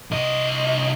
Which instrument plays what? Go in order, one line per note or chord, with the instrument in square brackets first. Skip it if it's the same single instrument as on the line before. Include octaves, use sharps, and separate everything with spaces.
[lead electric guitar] C2 D#5